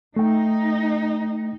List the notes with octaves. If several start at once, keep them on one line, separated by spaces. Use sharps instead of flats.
A3 D#4 G5